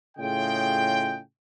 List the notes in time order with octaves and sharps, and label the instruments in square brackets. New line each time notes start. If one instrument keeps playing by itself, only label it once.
[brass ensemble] A2 C#3 F4 G#4 D#5 G5